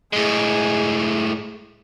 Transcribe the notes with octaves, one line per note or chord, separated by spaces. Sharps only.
A2 G#3 G#4